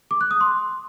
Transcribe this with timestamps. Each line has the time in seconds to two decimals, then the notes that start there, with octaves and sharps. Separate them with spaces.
0.11 D6
0.21 F#6
0.31 D#6
0.41 C6